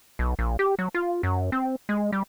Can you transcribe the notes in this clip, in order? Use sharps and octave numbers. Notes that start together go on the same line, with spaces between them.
B1
A#1
G4
F#3
F4
F#2
C4
G#3
G3